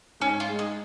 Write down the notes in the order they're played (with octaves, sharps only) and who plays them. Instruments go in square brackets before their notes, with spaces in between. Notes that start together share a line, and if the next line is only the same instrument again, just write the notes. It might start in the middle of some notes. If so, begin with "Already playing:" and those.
[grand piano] G#2 [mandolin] C#4
[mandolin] F4
[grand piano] G#3
[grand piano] D#4 [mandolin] G#4